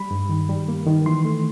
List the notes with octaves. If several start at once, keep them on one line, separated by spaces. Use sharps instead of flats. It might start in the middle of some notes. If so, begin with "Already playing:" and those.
Already playing: G3 B5
G2
D#3
G3
A#3
D#3
E3 C6
A3